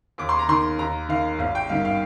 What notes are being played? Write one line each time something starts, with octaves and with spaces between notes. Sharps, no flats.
D#2 D6
C6
A#5
D#3 C6
D#2 A#5
D#3 F5
G#1 F5
G5
G2 D#3 F5
F5